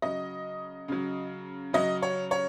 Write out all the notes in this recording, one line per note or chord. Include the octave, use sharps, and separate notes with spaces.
C#3 F#3 D#5
C#3 F#3
C#3 F#3 D#5
C#5
C#5